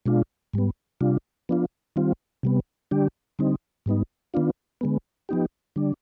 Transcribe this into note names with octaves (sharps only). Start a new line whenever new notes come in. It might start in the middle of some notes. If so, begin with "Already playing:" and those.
B2 G#3 D4 F4
G#2 G3 B3
C3 G3 D4 F4
F3 B3 D4 F4
D#3 G3 C4 F4
C3 G3 B3
D3 G3 D4 G4
D3 G3 C4 D#4
G#2 G3 B3 D#4
D#3 B3 D4 F4
D3 G#3 B3
F3 B3 D#4 G4
D3 G3 D4